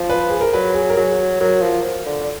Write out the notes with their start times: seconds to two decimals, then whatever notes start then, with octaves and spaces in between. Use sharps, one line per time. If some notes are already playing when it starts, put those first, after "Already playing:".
Already playing: F3
0.09 B4
0.30 G#4
0.41 A#4
0.53 F#3 B4
0.74 G#4
0.90 A#4
0.97 F#3 G#4
1.40 F#3 A#4
1.62 F3
2.06 D3
2.21 D5